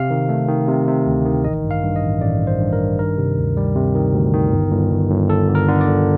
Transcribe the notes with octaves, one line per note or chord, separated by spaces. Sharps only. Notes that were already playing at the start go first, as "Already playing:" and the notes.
Already playing: C3 F5
D#3
A3
D#3
C3
C3
D2
D#3
A1 D#5
G2
F5
G2
D#5
A1
A1 D5
G2
C5
G2
A#4
G2
D#3 A#4
C3
D2
G3
C3
D#3
D2
D#3
G1
G1
G1
G1
G1 A4
D3
A#4
D3
D5
G1